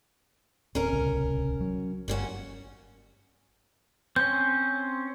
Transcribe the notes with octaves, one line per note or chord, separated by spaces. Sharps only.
D1 C4 C#4 A#4
D1 C2 C#3
F#3
G1 A#2 C#4 F#4
C4 C#4 G6